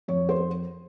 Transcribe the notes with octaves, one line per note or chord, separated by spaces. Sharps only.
F2 C#5
C5